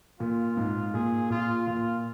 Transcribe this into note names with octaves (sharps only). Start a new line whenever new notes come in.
A#2 F4
G#2
A#2 G#4
A#2 F4
A#2 F4